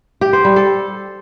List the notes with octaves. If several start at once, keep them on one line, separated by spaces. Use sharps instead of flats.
G4
C5
G3
A4